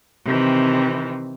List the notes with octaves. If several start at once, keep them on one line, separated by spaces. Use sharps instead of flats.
C3 D#3 E3 C4